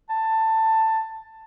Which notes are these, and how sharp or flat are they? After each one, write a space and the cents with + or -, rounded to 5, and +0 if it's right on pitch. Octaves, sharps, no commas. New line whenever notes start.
A5 +15